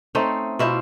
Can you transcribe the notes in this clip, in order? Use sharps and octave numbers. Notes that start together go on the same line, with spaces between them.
A3 C4 C#4 D#4
B2 E4 F4 C5